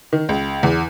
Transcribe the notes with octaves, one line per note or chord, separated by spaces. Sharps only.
D#3
C#2
E2